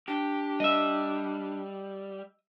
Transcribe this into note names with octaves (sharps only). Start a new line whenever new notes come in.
D4 G4
G3 D#5 E5